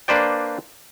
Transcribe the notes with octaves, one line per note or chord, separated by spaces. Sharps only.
A#3 D4 B4 C5 D5 G5